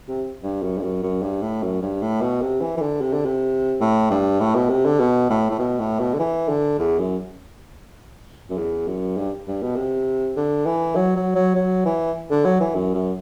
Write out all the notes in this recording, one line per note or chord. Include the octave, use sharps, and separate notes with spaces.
C3
G2
F#2
G2
F#2
F#2
G2
A2
F#2
G2
A2
B2
C3
E3
E3
D3
C3
D3
C3
A2
G2
A2
B2
C3
D3
B2
A2
A2
B2
A2
B2
D3
E3
D3
E2
F#2
F#2
E2
F#2
G2
G2
B2
C3
D3
E3
F#3
F#3
F#3
F#3
E3
D3
F#3
E3
F#2
F#2